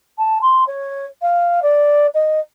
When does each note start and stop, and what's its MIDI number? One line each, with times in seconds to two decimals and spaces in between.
0.18 0.38 81
0.41 0.64 84
0.67 1.05 73
1.21 1.60 77
1.62 2.06 74
2.14 2.39 75